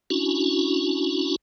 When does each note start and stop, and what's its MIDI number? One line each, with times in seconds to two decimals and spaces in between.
0.10 1.36 61
0.10 1.36 62
0.10 1.36 64
0.10 1.36 66